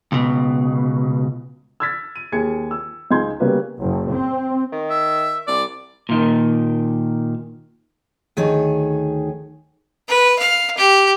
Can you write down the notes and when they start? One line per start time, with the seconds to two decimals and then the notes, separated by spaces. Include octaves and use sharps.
0.12 C#2 B2
1.80 E6 F6 G#6 A6 B6
2.16 D#7
2.32 D#2 G#4 G#6 C#7
2.71 E6
3.11 C#2 D#4 G#4 C6 G6 G#6
3.40 C#3 G3 A#3 B3 F#4 B4
3.80 F#1
4.12 C4
4.72 D#3
4.90 E5
5.47 C2 D5
6.09 A#2 D#3
8.37 D2 D#3 G#4 C#5
10.08 B4
10.39 F5
10.77 G4